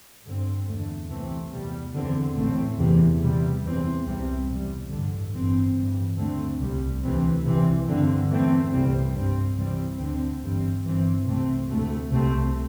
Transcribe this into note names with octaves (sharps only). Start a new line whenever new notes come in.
G2 D3 C4
E2 D3 A3
C2 C3 E3 A3 C4
E2 C3 G3
E2 D3 C4
A1 A2 A3 C4
E2 C3 E3
E2 C3 G3
E2 E3 C4
C2 C3 G3 C4
E2 C3 G3
A1 G2 D3
G1 G2 E3 C4
A1 G2 E3 G3
D2 D3 A3 C4
C2 C3 G3
D2 C3 E3 A3 C4
C2 C3 E3 C4
G2 D3 C4
E2 E3 A3 C4
C2 C3 G3 C4
G2 G3 C4
C2 C3 E3 G3 C4
D2 D3 C4
G1 G2 E3 G3 C4
G1 G2 E3 C4
C2 C3 A3 C4
D2 C3 A3
C2 C3 A3 C4